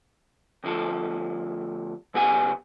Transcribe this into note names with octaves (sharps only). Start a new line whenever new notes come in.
D2 F3 A4
B1 C#3 B3 G4 F#5 G#5